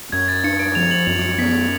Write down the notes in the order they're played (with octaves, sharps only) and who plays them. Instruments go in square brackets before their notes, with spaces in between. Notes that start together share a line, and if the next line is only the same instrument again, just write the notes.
[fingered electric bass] F#2 [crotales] G#6
[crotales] A6
[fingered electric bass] D4 [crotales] C#7
[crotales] D7
[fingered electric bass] F3 [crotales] F7
[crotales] F#7
[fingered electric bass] F#2 [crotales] F7
[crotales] C#7
[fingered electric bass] B3 [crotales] B6